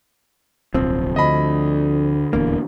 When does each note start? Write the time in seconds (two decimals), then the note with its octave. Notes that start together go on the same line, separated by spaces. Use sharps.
0.74 D1 B1 F3 C4
1.16 D2 D3 D#5 B5
2.33 D#1 E2 A#3 D4